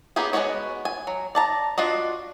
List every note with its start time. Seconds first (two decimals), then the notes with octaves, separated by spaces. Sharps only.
0.16 A#3 B3 C#4 G4 G#4
0.33 G#3 A#3 B3 F#4 C#5
0.85 G#5
1.07 F#3
1.35 D5 A5 A#5
1.78 D4 F4 F#4 D#5